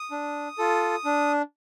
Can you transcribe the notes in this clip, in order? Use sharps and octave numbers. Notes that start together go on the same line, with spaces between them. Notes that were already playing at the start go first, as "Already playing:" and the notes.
Already playing: D#6
D4
F4 A4
D4